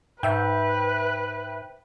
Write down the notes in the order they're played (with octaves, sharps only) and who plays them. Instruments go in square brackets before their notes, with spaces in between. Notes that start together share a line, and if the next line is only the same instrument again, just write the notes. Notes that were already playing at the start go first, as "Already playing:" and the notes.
[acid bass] G#2 [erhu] B4 [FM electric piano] E5 G5